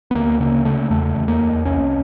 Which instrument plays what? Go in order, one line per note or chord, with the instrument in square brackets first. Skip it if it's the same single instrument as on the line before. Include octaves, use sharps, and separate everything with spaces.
[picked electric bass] B3
D2 A#3
C#3 A#3
C#3 A3
E2 A3
E2
A#3
E2
C2 C#4